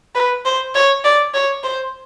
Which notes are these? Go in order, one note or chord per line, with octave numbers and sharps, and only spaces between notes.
B4
C5
C#5
D5
C#5
C5